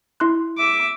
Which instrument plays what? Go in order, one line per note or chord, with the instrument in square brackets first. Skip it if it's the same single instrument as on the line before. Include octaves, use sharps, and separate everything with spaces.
[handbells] E4 C6 F#6
[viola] E5 D6